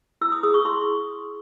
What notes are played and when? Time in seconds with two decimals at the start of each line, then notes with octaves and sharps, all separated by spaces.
0.21 E4 E6
0.32 D#6
0.43 G#4 D#6
0.54 C#6
0.65 E4 C6